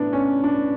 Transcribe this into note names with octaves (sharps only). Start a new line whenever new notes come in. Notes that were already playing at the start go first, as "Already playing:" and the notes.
Already playing: A2 E3 B3 D4
C#4
D4